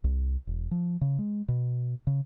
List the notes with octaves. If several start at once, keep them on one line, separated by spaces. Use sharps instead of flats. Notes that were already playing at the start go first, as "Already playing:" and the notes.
C2
E1
F3
C#3
G#3
B2
C#3